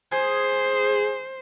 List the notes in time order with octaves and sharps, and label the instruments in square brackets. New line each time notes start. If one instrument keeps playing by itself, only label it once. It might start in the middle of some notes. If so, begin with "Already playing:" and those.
[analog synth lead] G#4 [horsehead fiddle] C5